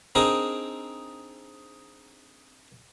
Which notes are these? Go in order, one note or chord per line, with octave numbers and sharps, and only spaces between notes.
C4 D4 D#4 G#4 A#4